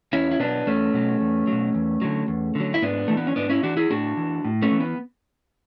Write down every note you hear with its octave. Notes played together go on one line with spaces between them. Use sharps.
E2 C#4 E4
E4
B2 F#3 B3 D4
E2 A3 C#4
B2 F#3
E2
B2 F#3
E2
D3 F#3
E2
D3 F#3
E4
G#2 B3 D4
E3 A3
B3
C#4
G#2 B3 D4
C#4 E4
E3 D4 F#4
E4 G#4
A2 D4 F#4
E3
A2
A3 C#4
E3
B3